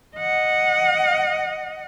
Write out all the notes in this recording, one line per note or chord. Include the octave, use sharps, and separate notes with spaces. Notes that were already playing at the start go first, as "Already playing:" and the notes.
D#5 F#5